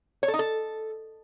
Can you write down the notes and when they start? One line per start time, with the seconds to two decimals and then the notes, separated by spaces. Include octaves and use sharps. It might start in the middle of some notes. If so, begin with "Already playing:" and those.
0.23 C#5
0.28 A4
0.34 D#4
0.39 A4